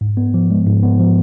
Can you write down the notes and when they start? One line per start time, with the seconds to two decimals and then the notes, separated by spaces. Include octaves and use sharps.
0.01 G#2
0.17 B3
0.34 F3
0.50 G#3
0.67 G#2
0.83 B3
0.99 F3